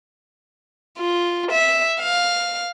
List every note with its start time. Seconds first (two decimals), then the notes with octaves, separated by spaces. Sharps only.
0.98 F4
1.51 E5
2.01 F5